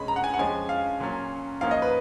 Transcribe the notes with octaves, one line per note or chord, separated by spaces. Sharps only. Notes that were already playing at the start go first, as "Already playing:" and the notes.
Already playing: B2 G#3 C#4 B5
A#5
F#5
G#5
F#5
F2 F3 G#3 C#4 G#5
F5
A#2 F#3 C#4
G#2 F3 A#3 C#4 F5
D#5
B4